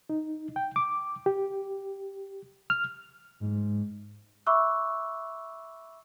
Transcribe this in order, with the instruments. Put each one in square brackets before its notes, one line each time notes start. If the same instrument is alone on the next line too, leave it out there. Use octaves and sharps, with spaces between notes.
[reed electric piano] D#4
G5
D6
G4
F6
[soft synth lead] G#2
[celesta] E5 B5 C#6 D6 E6 F#6